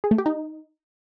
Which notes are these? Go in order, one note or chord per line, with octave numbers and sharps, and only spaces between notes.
G#4
A3
G4
D#4